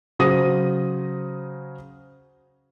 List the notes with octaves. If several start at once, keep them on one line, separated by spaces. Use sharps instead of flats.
C#3 F#3 C5 D#6 A#6